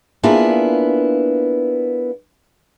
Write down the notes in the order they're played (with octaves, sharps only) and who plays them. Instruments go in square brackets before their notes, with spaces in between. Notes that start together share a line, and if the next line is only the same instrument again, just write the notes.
[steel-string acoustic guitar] A#3 B3 D4 E4 F4 G#4